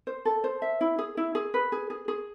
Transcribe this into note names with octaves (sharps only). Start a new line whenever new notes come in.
C5
A4
C5
E5
E4
G#4
E4
G#4
B4
G#4
G#4
G#4